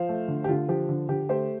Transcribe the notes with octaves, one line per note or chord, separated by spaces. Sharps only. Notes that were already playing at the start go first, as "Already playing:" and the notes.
Already playing: F3 C5 F5
A3
D3
G4
D3 F4
F3 G4
D3
D3 G4
A3 G4 C5